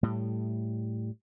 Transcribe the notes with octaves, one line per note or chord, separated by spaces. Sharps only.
A2 G3